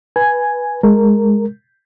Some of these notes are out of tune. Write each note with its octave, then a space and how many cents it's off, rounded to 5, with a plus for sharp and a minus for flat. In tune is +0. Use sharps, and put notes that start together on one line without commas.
B4 -10 G#5 +0
G#3 +0 A#4 -10